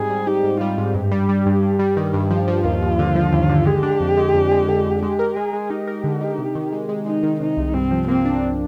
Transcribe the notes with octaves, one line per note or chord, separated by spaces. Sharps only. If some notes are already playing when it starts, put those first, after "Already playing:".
Already playing: G#2 G3 C4 G#4
G3
D#4 G4
G#2
G3 F4
G#2
G2 G4
G3
G3
G2
G2
G3
D#3
G2
F3 G4
F3
D#2 F4
D#2
D3
F3
D#2
D3
G#3 G4
D4
F2
G#3
F2
G#3
D3
D3
G#3 G4
A#4
G#3 G#4
G#3
D#4 G4
A#4
D3
D#4
C3
D#3
G#3
G#3
G#3 D#4
D#3
C3 D#4
C2
G2 C4
F3
A#3 C4
D4